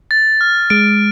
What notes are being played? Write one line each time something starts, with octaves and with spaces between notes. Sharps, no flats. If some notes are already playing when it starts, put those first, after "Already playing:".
A6
F6
G#3 D7